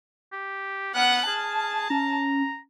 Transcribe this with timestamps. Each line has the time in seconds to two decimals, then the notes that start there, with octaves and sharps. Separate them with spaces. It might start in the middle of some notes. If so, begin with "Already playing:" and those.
0.33 G4
0.94 B3 F#5 F6 F#6
1.27 G#4 A5
1.90 C#4 A#5